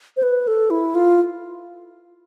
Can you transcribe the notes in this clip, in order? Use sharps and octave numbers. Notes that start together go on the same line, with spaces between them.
C5
B4
A4
E4
F4